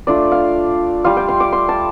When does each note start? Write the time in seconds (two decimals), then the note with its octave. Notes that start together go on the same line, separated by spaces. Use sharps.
0.07 A3 D4 F4 D5
0.32 F5
1.04 G3 F4 F5
1.17 G5
1.28 C6
1.40 D6
1.52 C6
1.69 A5